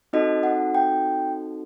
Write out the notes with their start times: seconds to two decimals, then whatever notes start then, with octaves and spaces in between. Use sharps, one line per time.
0.13 C4 D#4 F#4 A4 D#5
0.43 F#5
0.75 G5